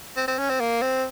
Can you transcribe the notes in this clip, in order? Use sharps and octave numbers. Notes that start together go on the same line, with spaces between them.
C4
C4
C#4
C4
A#3
C4